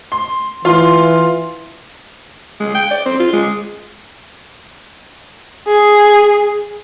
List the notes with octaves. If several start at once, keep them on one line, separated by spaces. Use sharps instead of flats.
C6
E3 F4 C6
G#3
G5
D5
C4
F4
G#3
G#4